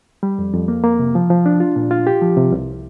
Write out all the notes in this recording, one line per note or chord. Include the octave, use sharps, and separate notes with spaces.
G3
F2
F2
A#3
A#3
C3
F3
F3
D4
F4
A#2
F4
G4
F3
C3
C2